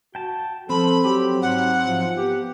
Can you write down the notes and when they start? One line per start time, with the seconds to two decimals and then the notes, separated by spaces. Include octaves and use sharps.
0.15 F#4 G5 A5
0.69 F3 C4 A4 B5
1.04 F#3 G4
1.42 G#2 F#5
1.85 G#2 F3
2.17 B3 G4